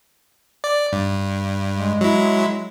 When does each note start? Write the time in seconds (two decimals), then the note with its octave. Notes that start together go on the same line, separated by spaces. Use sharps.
0.64 D5
0.93 G2
1.73 G#3
2.01 F#3 E4